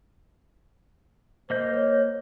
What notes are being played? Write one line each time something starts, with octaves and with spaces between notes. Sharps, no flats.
A#3 C5 D#5 G6
C#5